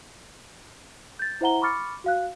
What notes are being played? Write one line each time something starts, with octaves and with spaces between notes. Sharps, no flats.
G6 A6
E4 C5 E5 F#5 A#5 G7
B5 C#6 D6 F6 A6 C#7
F#4 F5 F#6